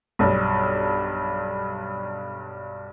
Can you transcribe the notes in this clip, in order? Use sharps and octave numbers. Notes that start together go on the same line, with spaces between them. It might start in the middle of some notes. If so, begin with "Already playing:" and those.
B1 G2